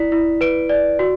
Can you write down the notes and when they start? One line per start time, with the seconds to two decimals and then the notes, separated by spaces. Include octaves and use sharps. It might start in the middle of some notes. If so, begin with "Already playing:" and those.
Already playing: E4 D5 B6
0.12 E4
0.41 B4 D7
0.69 D5
0.99 F#4